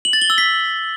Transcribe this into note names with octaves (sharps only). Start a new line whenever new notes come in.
F#7
A6
G7
E6
B6